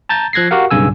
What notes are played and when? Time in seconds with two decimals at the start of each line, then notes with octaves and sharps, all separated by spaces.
0.09 A5 A#5 G6 A6
0.33 F3 F#6 G#6 A#6 C7
0.51 F#4 G4 A#4 F5 F#5
0.71 B1 G2 C#3 G#5 E6